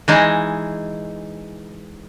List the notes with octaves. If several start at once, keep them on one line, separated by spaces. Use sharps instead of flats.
E3 G#3 D#4